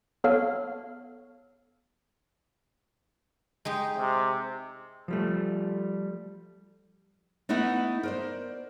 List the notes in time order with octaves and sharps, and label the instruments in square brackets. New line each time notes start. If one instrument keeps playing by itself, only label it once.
[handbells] B3 A4 C#5 F5 F6
[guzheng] G#3 D#4 G4
[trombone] C3
[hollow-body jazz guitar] F3 G3 A3
[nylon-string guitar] A3 B3 D#4 E4 D#5 F#5
A#4 C5 D5